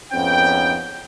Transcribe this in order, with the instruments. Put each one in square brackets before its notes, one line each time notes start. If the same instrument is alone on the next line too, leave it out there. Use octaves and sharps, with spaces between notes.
[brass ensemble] F2 G#2 B3 C#4 G5